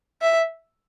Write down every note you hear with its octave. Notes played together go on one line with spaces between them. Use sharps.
E5